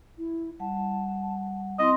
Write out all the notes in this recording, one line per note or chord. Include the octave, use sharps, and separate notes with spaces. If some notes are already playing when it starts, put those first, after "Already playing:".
E4
G3 F#5 A5
C4 E4 D#5 C6